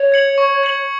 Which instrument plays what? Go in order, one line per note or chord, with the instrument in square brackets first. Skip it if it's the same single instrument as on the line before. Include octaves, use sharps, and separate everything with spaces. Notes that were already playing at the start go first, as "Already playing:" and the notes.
Already playing: [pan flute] C#5
[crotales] G#6 C#7 F#7
C#6
G#6 C#7 F#7